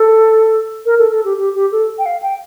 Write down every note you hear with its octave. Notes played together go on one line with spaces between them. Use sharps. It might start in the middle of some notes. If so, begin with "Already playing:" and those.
Already playing: A4
A#4
A4
A4
G4
G4
G4
A4
G5
F5
G5